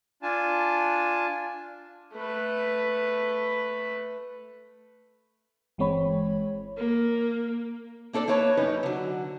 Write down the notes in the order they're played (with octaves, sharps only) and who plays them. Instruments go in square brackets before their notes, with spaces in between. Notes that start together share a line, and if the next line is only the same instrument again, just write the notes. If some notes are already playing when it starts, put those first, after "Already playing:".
[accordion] D4 F4 G#5 A5
[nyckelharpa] A3 B4
[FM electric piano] G1 E3 G#3 C4 C#5 B5
[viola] A#3
[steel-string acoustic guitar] A#3 D4 A4 C5 D5
A#3 E4 B4 C#5 A5
F#2 C#4 D#4 B4
D3 F#3